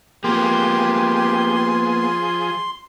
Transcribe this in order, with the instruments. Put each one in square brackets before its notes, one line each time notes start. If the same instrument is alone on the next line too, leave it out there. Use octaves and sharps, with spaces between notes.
[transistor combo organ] F3 G#4 [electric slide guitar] A#3 B3 [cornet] G4 [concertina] C6